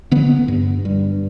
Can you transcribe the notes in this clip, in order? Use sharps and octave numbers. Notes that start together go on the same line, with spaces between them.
D3 B3
G2
G2